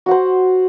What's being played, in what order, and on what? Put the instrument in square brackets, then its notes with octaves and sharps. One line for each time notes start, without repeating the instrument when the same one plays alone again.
[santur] F#4
F#5
C5